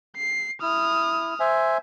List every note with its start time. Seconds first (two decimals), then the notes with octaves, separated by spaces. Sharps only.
0.16 C7
0.62 E4 D#6 F6
1.40 C5 E5 G#5